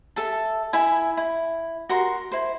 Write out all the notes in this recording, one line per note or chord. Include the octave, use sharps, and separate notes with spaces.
A4 E5 A5
E4 E5 G#5 B5
E4
F#4 A#4 C6
E4 C5